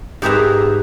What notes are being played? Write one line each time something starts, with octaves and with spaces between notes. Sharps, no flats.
G#2 G4 G#4 B4 E5 A#5